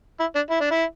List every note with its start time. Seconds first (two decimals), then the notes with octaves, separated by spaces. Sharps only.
0.20 E4
0.35 D4
0.50 E4
0.61 D4
0.71 E4